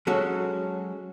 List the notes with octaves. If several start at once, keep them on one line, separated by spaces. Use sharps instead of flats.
F#3 G#3 C#4 F#4 A4